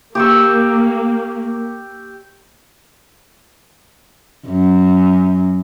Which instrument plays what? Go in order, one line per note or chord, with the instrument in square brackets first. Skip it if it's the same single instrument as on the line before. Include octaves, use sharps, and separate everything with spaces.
[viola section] A#3 [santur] G4 C#6 E6
[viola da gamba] F#2